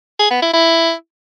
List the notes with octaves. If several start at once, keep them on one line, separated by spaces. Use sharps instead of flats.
G#4
B3
E4
E4